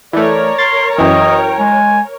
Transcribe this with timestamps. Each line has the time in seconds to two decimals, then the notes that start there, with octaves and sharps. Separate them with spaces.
0.13 E3 A3 A#4 C#5 D5
0.58 C6 A6
0.98 F#2 E3 D#5 G5
1.59 G#3 G#5